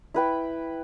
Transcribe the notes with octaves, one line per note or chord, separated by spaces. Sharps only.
E4 B4 G5